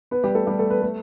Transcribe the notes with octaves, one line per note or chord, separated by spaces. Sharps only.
B3 B4
G3 G4
A3 A4
G3 G4
A3 A4
B3 B4
A3 A4